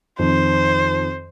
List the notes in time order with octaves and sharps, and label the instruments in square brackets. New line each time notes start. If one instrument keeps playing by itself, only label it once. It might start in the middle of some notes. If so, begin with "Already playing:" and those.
[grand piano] F2 D#3 [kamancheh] C5